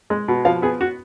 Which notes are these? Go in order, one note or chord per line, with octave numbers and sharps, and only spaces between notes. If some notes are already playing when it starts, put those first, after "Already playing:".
G#3
B2
F3 F5
B3 G#4
F#4